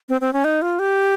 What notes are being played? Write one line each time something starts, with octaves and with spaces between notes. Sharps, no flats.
C4
C4
C#4
D#4
F4
G4